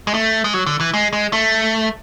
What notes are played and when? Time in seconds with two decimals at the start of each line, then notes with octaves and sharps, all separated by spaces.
0.07 G#3
0.14 A3
0.44 G#3
0.54 F#3
0.66 D3
0.80 E3
0.94 G#3
1.13 G#3
1.33 A3